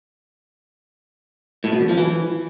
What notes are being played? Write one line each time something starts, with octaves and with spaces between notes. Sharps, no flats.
A2
B2
E2
F3
E3